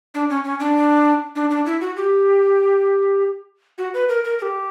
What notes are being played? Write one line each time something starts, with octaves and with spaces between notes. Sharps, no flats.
D4
C#4
C#4
D4
D4
D4
E4
F#4
G4
F#4
B4
A#4
A#4
A#4
G4